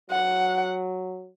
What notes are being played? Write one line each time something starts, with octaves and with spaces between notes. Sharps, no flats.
F#3 F#5